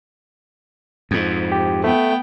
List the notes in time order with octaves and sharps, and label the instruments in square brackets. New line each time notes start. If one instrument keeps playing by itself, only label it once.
[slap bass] F2 G#2
[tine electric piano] G4
[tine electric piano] A3 [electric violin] B3 G5